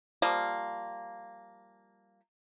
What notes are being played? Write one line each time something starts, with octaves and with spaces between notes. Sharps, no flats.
F3 G3 A#3